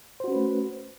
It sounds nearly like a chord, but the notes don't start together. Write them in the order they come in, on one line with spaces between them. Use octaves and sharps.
C5 F#4 C#4 B4 A3